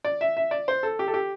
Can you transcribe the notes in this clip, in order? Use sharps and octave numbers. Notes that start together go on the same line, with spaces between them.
D5
E5
E5
D5
C5
A4
G4
A4
G4